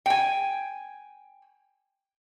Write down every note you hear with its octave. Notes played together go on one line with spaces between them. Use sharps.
G5 G#5